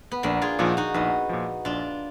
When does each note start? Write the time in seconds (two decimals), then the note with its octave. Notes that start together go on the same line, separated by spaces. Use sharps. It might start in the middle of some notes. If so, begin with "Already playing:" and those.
0.12 B3
0.23 A#1 A#3 D4
0.42 F4 G#4
0.59 A#2 F3 D#4 F#4
0.77 D#4 F#4
0.94 A#1 B3 D#4
1.29 A#2 F3
1.65 A#1 D4 F4